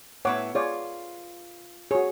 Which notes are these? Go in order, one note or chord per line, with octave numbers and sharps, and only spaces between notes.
A2 B3 E4 C#5 F#5 D6
F4 G#4 C#5 D5
F#4 G#4 C#5